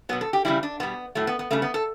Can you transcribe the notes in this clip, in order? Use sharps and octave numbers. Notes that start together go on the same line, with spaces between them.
B2 F#3 B3
A4
G4
C#3 E3 G3 E4
D4
B2 G3 B3
A2 F#3 A3
B3
B3
C#3 G3 A3
B3
A4